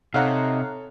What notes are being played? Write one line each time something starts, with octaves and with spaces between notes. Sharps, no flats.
C3 D#4 A4 C#5 F5 F#5 A#5